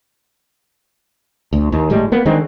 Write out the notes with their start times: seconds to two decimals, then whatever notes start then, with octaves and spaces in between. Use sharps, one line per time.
1.53 D2
1.72 D#2
1.90 G1 A2 G3 G#3
2.12 A#3 B3
2.25 D3 D#3 G#3 C4